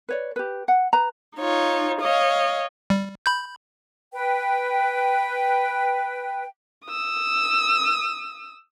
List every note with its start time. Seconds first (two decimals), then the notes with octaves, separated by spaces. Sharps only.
0.09 B4 C#5 D5
0.36 G4 B4
0.68 F#5
0.93 B4 A#5
1.37 D#4 F4 C#5
2.01 C#5 D#5 F5
2.90 G3
3.26 B5 G6
4.13 B4 G5
6.86 D#6 E6